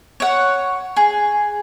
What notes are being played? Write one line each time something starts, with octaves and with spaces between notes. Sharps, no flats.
C#5 F#5
G#4